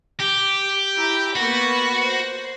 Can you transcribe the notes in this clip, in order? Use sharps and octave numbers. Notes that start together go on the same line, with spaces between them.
G4
E4 G5 A#5
A#3 B3 F#4 B4
C5